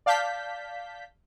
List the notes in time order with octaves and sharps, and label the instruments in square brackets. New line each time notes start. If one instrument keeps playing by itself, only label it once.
[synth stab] D5 F5 A5 G6 B6